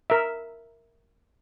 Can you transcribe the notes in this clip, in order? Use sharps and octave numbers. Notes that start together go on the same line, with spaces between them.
A#4 E5